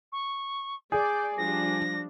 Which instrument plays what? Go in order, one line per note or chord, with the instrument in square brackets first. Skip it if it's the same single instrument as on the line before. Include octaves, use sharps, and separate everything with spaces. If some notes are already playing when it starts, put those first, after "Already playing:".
[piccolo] C#6
[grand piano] G#4 [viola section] D5 [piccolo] G6
[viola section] F3 G3 D4 [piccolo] A#6